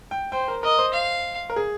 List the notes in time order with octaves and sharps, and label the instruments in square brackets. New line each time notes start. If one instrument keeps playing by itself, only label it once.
[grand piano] G5
[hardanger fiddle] C5 [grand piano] G5
[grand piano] A#4
[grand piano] A#4 [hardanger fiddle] D#5
[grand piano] C5
[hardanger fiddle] F5
[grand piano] A#4
G#4